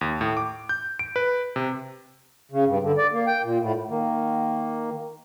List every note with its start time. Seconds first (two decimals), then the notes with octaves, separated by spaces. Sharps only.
0.01 D#2
0.21 A2
0.37 D6
0.69 G6
0.99 D7
1.16 B4
1.56 C3
2.52 C#3
2.67 G2
2.83 D3
2.98 D5
3.12 A#3
3.27 G5
3.43 A#2
3.60 A2
3.89 D#3 A#3